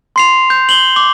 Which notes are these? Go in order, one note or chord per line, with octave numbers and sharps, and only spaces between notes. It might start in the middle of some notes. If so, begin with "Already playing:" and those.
C6 C7 F7
G6
F#7 G7
D6